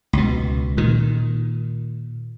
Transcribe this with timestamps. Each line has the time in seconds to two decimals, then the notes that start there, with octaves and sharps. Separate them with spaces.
0.13 C#2 B2
0.77 A#2 D#3